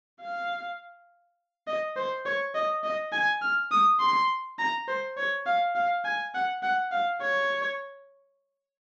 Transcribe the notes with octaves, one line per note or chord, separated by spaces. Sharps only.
F5
D#5
C5
C#5
D#5
D#5
G#5
F6
D#6
C6
A#5
C5
C#5
F5
F5
G#5
F#5
F#5
F5
C#5